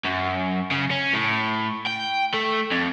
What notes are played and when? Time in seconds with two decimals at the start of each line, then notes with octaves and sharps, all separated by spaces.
0.05 F#2
0.71 C#3
0.91 C#4
1.13 A2
1.87 G5
2.34 A3
2.71 F2